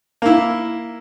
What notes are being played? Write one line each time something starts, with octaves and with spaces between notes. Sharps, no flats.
A#3 E4